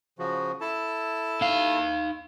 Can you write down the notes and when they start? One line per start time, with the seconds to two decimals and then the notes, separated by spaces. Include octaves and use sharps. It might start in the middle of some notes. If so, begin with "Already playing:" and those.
0.19 C#3 F3 F#4
0.61 E4 A4 A5
1.41 D#4 F5